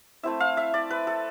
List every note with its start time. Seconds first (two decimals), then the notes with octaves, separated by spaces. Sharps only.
0.23 A3 C4 E4 E5
0.40 F5
0.57 E5
0.74 D5
0.91 B4
1.07 A4